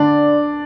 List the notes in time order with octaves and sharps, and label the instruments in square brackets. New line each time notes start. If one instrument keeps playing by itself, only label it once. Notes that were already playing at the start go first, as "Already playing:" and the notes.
Already playing: [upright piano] D3 D4 [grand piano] D5